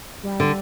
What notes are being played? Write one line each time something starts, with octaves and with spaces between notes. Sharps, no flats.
G3
D3